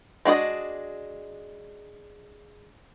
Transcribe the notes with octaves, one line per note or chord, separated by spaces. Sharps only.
G#3 D4 F#4 D#5